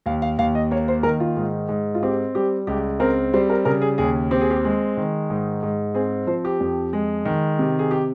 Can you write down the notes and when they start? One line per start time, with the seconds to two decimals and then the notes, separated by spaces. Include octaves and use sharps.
0.06 D#2 F5
0.22 F5
0.38 D#2 F5
0.55 D#5
0.71 A#3 C#5
0.88 C5
1.03 D#3 A#4
1.20 F4
1.36 G#2
1.69 G#2
1.95 F4
2.03 C4 G4
2.35 G3 G4
2.67 C#2 G4
3.00 C4 A#4
3.33 G3 C5
3.50 A#4
3.65 C#3 A#4
3.82 G#4
3.98 D#2 G#4
4.31 C4 G4
4.41 G#4
4.51 G4
4.65 G#3
4.97 D#3
5.30 G#2
5.63 G#2
5.94 C4 G#4
6.27 F3 C5
6.45 G4
6.60 F2
6.93 G#3
7.25 D#3
7.59 C3
7.79 G#4
7.91 G4